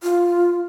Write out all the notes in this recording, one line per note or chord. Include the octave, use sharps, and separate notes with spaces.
F4